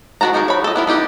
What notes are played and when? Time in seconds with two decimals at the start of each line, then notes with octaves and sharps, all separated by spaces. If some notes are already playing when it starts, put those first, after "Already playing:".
0.21 D#3 F#3 F#4 A5 A#5
0.33 F3 D#4 F#4 G#4 A#4
0.48 C#5 B5
0.64 A4 D#5
0.76 B3 E4 A#4
0.87 B3 D#4 G4 D#5